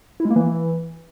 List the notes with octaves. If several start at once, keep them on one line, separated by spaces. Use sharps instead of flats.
E4
G#3
A#3
E3